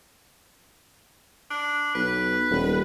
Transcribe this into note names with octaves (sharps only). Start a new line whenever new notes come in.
D4
B1 B4
D#1